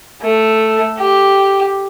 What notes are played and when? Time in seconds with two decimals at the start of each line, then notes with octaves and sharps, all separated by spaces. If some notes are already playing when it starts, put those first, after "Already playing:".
0.21 A3
0.97 G4